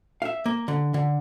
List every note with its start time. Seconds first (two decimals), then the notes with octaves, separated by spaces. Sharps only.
0.22 E5 F5
0.46 A#3
0.68 D3
0.94 D3